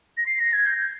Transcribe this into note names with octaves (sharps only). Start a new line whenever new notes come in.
A#6
C7
A#6
G#6
G6
G6